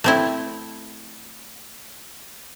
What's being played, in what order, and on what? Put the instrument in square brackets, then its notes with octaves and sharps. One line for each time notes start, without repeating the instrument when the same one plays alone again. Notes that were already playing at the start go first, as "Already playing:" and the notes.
[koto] A3 C4 E4